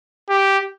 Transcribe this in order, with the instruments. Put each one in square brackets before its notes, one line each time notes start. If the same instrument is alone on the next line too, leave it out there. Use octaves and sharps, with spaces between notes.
[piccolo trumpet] G4